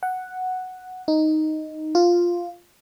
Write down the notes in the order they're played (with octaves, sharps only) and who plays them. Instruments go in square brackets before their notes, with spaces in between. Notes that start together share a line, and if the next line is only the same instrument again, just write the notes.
[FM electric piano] F#5
D#4
F4